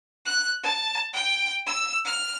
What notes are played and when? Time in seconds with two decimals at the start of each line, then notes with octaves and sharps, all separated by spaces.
0.24 F#6
0.62 A5
1.12 G5
1.66 E6
2.04 F6